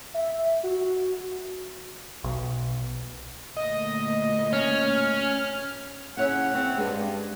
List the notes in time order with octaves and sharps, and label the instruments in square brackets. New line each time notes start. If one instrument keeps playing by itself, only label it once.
[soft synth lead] E5
F#4
[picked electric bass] B1
[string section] D2 A#2 [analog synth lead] D#5
[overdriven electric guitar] C#4 [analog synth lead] F6
[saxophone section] C#3 E4 F#5 [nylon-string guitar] C#4 C#5 E5
[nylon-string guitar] C4 C#5
[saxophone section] G2 [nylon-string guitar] G#3